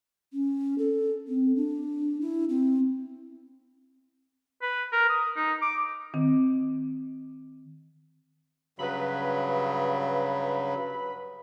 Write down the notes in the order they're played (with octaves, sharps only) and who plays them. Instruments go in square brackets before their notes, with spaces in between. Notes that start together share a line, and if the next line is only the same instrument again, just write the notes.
[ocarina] C#4
A4
C4
D4
E4
C4
[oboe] B4
A#4
D#6
D#4
D6
[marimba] D#3 C4
[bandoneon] G2 C#3 F#3 [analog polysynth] B4 B5